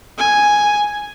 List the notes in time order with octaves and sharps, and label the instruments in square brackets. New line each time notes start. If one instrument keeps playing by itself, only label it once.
[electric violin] G#5